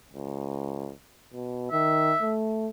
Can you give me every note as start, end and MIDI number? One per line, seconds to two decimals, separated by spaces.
0.13 0.92 37
1.33 1.69 47
1.72 2.14 51
1.72 2.34 76
2.21 2.70 57